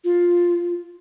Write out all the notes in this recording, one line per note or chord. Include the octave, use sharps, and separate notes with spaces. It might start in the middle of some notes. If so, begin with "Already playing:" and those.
F4